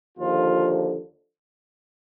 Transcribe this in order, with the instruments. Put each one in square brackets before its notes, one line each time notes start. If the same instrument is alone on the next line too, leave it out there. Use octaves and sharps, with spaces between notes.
[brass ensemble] D#2 D3 F3 F4